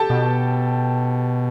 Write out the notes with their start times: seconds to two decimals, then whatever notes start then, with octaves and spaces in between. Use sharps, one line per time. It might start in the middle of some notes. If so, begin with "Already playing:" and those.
Already playing: G4 A4 G5 A5
0.10 B2